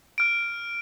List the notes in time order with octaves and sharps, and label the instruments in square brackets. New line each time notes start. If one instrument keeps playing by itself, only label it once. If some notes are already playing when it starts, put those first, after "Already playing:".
[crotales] F6 D7